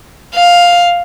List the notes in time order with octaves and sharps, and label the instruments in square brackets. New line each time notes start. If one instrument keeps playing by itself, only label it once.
[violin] F5